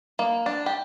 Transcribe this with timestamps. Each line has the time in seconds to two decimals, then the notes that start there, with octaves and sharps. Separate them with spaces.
0.19 A#3
0.46 D4
0.66 G4